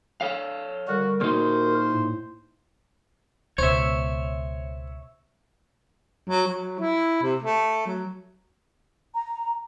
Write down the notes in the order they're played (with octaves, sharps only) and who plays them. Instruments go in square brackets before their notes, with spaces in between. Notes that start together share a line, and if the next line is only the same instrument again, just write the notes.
[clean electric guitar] A4 C#5 F5
[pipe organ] D3 G3 A#4 [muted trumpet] F#4
[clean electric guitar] A#2 D#4 [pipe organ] F#4 A#4 [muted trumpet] C5
[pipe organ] A2
[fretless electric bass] C#2 B2 [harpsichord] C5 [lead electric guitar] C#5 E5 [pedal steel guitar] C#6
[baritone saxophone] F#3
F#3
E4
C3
A3
F#3
[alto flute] A#5